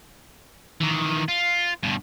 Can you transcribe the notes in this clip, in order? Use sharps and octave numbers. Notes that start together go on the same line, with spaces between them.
D#3 E3
F4
G2 B2